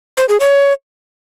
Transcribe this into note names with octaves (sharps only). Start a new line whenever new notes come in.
C5
G#4
C#5